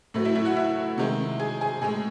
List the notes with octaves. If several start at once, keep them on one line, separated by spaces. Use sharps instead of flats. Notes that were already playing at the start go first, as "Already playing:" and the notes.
A2 F#3 A3
E4 E5
E4 E5
F#4 F#5
E4 E5
C3 D#3 G#3
G#4 G#5
G#4 G#5
A2 G#3 G#4 G#5